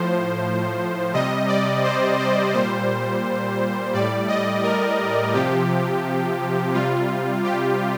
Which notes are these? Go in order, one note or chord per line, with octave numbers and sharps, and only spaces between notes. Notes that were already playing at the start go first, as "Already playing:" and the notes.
Already playing: A2 F3 C5
C3 G3 D#5
D5
C5
C5
A#2 G3 C5
A2 G3 D5
D#5
A#4
C3 F3 G4
C3 G3 F4
G4